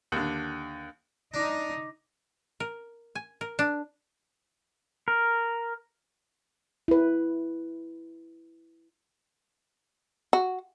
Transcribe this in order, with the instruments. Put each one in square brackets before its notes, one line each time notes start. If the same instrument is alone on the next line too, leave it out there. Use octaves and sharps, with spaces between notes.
[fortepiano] D#2 D3
[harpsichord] D4 [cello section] D#4 [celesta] D6 A#6
[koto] A#4
G#5
A#4
D4
[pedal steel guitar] A#4
[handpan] E4 B4
[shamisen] F#4